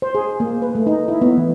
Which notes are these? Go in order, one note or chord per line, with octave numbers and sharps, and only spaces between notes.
C5
G#4
A#3
B4
A3
D#4
E4
B3
E3